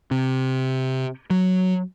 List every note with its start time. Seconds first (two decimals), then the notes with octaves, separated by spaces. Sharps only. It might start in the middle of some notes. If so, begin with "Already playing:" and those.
0.11 C3
1.30 F#3